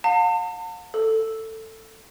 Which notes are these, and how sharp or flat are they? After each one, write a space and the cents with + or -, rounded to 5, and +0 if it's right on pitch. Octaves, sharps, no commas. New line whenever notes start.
F5 +45 A5 +45
A4 +15 E6 +0